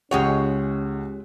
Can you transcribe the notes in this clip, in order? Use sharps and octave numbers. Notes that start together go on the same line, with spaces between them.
C#2 G#3 C#4 G4 C#5 F#5